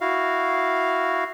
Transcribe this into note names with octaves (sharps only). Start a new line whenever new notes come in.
E4 F#4 F5